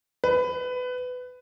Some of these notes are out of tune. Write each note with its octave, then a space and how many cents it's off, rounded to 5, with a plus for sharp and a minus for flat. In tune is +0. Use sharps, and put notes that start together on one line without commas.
B4 +20